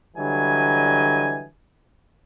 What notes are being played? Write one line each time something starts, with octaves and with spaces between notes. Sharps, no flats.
D3 E3 F#3 G3 D#5 G#5